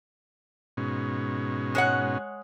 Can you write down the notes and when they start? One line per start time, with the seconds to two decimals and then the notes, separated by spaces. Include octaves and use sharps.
0.77 G#2 B2 C#4
1.75 G#3 C#5 F#5